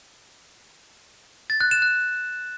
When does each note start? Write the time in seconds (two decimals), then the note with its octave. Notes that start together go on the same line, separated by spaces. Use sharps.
1.50 A6
1.61 F#6
1.71 E7
1.82 F#6